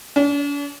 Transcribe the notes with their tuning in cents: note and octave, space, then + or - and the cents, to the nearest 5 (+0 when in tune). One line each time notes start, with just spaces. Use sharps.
D4 -45